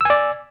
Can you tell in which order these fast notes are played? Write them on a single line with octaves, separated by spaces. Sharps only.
E6 G#5 D5